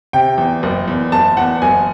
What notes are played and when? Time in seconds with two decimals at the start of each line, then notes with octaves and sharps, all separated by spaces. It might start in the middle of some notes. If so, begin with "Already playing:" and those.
0.13 C3 G5
0.38 E2
0.63 F#1
0.88 E2
1.12 F#1 A5
1.37 E2 F#5
1.62 F#1 G#5